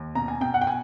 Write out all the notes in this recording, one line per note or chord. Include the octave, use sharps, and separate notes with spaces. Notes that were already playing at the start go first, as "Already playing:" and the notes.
Already playing: D#2
B2 A#5
G#5
B2 G5
F#5
G5
G#5